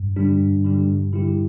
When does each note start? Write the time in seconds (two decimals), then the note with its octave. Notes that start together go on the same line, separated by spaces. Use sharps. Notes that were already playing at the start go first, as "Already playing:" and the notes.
Already playing: G2
0.16 D3 G3 D4 G4
0.40 G2
0.65 D3 G3 D4 G4
0.88 G2
1.13 D3 G3 E4 G4